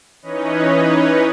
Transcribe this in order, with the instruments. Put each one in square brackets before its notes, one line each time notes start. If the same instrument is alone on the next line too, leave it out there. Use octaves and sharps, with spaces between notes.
[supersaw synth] E3 C#4 D#4 B4 C#5 D#5